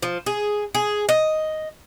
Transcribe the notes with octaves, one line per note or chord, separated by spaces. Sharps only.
F3
G#4
G#4
D#5